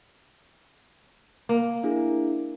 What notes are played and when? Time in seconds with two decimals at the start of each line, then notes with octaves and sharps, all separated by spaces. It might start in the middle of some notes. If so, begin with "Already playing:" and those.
1.49 A#3
1.84 D4 E4 G#4